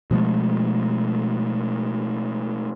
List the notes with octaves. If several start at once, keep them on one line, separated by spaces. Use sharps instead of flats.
B2 F3 G#3 A3